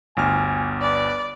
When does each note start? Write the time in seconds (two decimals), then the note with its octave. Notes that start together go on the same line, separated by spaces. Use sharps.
0.17 G1 D2 G#5 F6
0.82 B4 D5